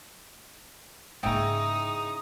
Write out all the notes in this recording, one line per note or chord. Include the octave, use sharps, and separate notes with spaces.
G#2 C#3 A#3 D#4 E4 G5 D#6